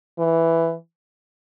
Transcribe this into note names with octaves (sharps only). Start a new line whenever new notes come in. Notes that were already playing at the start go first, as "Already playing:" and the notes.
E3